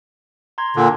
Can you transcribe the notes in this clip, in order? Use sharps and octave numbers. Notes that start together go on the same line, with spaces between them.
A#5 C6 G#6
A#2 D3